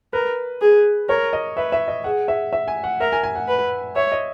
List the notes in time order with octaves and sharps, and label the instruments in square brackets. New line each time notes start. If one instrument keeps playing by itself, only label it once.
[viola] A#4 [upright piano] B4
[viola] G#4
[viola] A#4 [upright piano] C#5
[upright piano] D#5
[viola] B4 [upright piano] E5
[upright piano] E5
D#5
[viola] G#4 [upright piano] F#5
[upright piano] E5
E5
G#5
F#5
[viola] A#4 [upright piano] E5
[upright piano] G#5
G#5
F#5
[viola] B4
[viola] C#5 [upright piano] E5
[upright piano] D#5